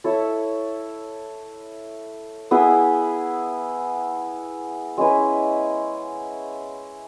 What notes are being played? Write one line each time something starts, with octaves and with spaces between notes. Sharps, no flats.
E4 A4 C#5 E5
B3 E4 G#4 B4
G#3 C#4 E4 B4